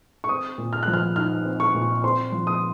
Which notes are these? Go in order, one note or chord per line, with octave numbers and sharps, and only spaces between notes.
C#6
C4 D#6
A#2
F6
F#6
F3
F6
D#4 F6
C4
C#6
A#2
C4 C6
F3
D#6